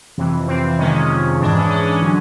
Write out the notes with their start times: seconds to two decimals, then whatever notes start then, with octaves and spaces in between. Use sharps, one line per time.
0.18 F2 C3 E3
0.47 F2 C3 E3 C4
0.78 F2 C3 D#3 G#3 C#4
0.93 C#4
1.09 F2 C3 D#3 G#3
1.41 G#2 E3 G#3 D4
1.56 C#4
1.71 G#2 E3 G#3 C#4
1.87 C#4
2.02 D3 F#3